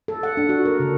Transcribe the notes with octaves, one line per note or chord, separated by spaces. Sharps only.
A4
F#5
D4
F#4
A#4
C#3